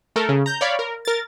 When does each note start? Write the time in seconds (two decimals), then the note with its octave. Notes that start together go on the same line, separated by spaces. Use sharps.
0.16 A3 A4 A#4
0.29 C#3
0.46 A#5 G6
0.61 C#5 D5 F5 B5
0.79 A#4
1.05 A#4 A6